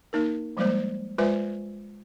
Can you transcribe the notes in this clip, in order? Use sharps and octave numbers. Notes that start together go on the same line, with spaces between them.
A#3 D#4 A#4
F3 G3 G#3 A#3 C5
G#3 F4 B4 C5 E5 G#5